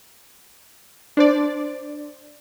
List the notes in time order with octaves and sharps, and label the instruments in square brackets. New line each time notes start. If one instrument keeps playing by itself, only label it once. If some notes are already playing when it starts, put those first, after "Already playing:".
[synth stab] D4 C5 D5